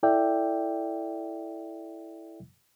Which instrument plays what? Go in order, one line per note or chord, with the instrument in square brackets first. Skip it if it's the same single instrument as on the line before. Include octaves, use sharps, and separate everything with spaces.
[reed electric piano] E4 A4 D5 E5 G5